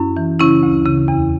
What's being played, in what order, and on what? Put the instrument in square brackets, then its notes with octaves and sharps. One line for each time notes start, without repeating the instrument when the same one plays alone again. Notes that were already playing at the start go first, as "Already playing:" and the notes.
Already playing: [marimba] F#2 C#4 E4
E3
C#3 C#4 E4
D2
C#3
E2